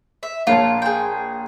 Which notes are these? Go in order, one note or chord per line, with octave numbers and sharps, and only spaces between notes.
E5
A#1 F4 C#5 A5
G#4 G5